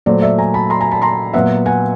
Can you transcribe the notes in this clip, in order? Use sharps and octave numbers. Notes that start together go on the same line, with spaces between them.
A#2 F#3 A3 C5 D5
D5 E5
G#5 A#5
A5 B5
A#5 C6
G#5 A#5
A5 B5
A#5 C6
A#2 F#3 B3 E5 F#5
F#5 G#5